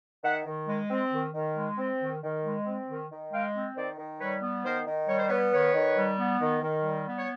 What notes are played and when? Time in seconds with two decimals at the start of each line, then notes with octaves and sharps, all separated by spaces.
0.24 D#3 E5 F#5
0.46 D#3
0.68 G#3
0.90 C4
1.12 D#3
1.34 D#3
1.56 G#3
1.78 C4
2.01 D#3
2.22 D#3
2.44 G#3
2.66 C4
2.88 D#3
3.11 D#3
3.32 G#3 F5 G5
3.55 C4
3.76 D#3 C5 D5
3.98 D#3
4.20 G3 B4 C#5
4.42 B3
4.64 D#3 A#4 C5
4.86 D#3
5.08 G3 C#5
5.19 C5
5.29 B3 B4 C#5
5.52 D#3 B4 C#5
5.74 D#3
5.97 G3
6.18 B3
6.40 D#3
6.62 D#3
6.84 G3
7.06 B3
7.18 C#5